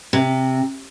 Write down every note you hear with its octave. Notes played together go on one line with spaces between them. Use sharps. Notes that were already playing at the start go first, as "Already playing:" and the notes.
C3